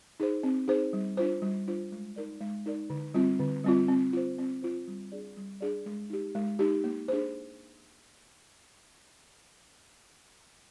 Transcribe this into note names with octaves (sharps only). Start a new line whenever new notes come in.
D#4 G#4 C5
C4
D#4 G#4 C5
G3
D4 F4 C5
G3
D4 F4 C5
G#3
D#4 A#4 D5
G#3
D#4 A#4 D5
D3
G3 C4 F4
D3
G3 C4 F4
C4
F4 C5
C4
F4 C5
G3
D4 G#4 D5
G3
D4 G#4 D5
G#3
D#4 G4
G#3
D#4 G4
A#3
D4 G#4 C5